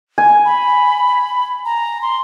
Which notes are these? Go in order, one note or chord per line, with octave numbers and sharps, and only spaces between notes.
G#5
B5
A#5
C6